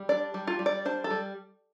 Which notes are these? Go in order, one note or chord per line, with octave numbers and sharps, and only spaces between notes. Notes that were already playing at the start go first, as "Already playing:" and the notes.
Already playing: G3
D4 D5
G3
F4
G3
D5
D4 C5
A4
G3